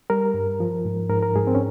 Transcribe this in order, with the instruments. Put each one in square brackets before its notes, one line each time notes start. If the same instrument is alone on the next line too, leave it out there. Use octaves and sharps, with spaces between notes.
[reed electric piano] G3 A#4
G2
F3
G#2
G#2 A#4
A#4
G#2 G#4
C4
C#4